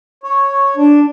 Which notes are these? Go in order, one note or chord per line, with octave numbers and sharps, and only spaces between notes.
C#5
D4